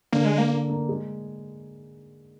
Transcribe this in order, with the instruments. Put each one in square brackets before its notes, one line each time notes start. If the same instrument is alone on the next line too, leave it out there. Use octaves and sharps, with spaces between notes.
[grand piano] D3 [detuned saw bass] A#3
[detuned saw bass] G#3
A#3
[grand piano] A#3
A#3
G#3